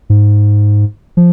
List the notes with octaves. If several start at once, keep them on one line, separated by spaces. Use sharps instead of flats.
G#2
F3